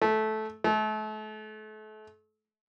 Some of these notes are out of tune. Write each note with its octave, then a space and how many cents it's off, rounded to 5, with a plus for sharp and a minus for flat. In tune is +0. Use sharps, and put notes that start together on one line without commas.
A3 -15
A3 -35